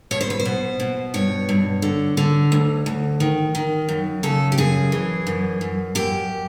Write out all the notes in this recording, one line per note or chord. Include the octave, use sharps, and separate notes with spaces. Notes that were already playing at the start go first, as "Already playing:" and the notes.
B2 C#5
C5
B4
C5
B2
B2
G2 C#5
G2
D3
D3
D2
D2
D#3
D#3
F#2
C#3 A4
G4
F#2 G#4
E3
F#2
F#2
F#2 G4